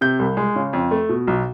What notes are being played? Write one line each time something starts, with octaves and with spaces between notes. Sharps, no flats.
C3 G6
C2
G#3
C#3
F2
A3
B2
B1